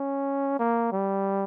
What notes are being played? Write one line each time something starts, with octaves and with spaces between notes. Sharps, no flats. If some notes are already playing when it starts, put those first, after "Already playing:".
Already playing: C#4
A#3
G3